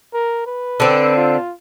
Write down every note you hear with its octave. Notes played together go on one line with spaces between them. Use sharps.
A#4
B4
D3 C4
F4